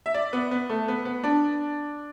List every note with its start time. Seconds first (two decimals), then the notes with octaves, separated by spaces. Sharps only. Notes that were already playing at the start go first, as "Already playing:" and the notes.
0.06 E5
0.14 D5
0.33 B3
0.51 B3
0.69 A3
0.88 B3
1.05 B3
1.24 D4